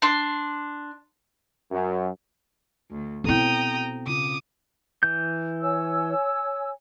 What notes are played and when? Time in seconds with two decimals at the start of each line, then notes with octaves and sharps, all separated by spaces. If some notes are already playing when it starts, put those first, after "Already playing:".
0.02 D4 C6
1.72 F#2
2.90 D2
3.24 B2 B3 C4 E4 A4 G5 A#5 D#6
4.07 C#3 F4 D6 D#6
5.03 E3 G6
5.61 C#5 G#5 E6